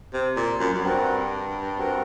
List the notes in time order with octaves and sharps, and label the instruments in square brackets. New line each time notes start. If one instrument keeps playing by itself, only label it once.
[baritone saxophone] C3
A#2
F#2
F#2
[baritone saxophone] G2 [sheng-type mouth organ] C4 F#4 A#4
[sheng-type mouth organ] C4 F#4 A#4